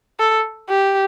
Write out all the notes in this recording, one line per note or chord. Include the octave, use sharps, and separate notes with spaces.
A4
G4